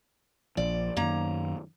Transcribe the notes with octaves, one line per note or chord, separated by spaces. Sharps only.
A#1 F3 D5
F#2 D#3 A#3 A#5